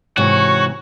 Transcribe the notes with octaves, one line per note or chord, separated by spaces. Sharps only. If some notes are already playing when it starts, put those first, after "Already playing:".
G#2 C3 E3 F#4 C#5